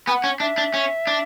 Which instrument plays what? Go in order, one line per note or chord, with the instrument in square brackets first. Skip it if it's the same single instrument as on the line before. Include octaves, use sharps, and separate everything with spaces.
[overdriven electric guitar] B3 [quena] G#5
[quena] F#5
[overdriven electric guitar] C#4
[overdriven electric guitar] D4 [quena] E5
[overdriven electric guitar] D4
C#4
D4